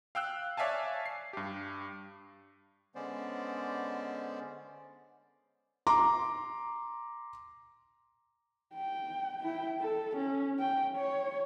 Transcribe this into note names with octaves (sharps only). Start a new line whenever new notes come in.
F5 G5 E6 F#6
C#5 D5 E5 F5 G#5 A5
C7
G2 G4
D3 G#3 B3 C#4 C5 D5
A#5 C6 D6
G5
E4 G5
A4
C#4
G5
C#5